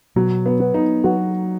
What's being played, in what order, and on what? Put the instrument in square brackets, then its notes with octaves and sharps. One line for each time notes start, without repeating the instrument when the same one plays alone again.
[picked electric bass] B2 [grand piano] F#3
[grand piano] B3
[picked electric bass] B3
[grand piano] D#4
[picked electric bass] F#3 [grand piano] F#4